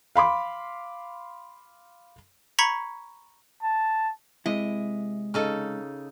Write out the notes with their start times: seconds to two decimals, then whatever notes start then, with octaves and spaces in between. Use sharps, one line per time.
0.16 F5 B5 C6 D6
2.59 A#5 B5 C#6 G#6 B6 C#7
3.63 A5
4.46 C3 G#3 E4 D#5
5.34 C#3 D#4 A4